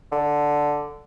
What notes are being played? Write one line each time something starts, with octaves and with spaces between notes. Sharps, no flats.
D3